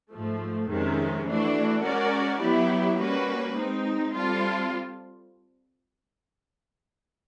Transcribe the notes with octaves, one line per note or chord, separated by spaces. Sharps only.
G#2 F3 A3
F2 C3 D#3 G#3 C#4
E3 A3 D4 F#4
G#3 C#4 F#4 A#4 D5
F#3 B3 E4 G4
G3 A#3 C#4 F#4 B4
G#3 C4 D#4
G3 C4 F4 A4